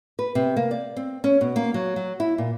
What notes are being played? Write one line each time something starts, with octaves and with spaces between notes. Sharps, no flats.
B4
C3
A#3
D5
C4
C#4
B2
A#3
F#3
F#3
E4
A#2